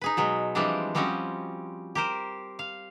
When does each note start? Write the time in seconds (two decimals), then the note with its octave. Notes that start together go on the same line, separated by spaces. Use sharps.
0.01 D#4 G#4 B4
0.17 B2 F#3 G#3
0.55 E3 F3 G3 G#3 C4 D4
0.95 F3 G3 C4 C#4 F#4 D#5
1.95 G4 A#4 C5
2.59 F5